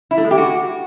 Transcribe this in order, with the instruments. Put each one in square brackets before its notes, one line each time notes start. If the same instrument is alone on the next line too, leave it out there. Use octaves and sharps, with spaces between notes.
[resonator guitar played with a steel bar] E4
A3
G#3
G4
F#4